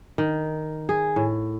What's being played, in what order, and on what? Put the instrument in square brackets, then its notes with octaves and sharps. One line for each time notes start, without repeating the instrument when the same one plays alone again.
[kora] D#3
G#4
A2